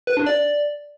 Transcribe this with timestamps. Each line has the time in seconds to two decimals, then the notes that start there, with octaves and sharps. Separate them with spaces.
0.07 B4
0.17 D4
0.26 D5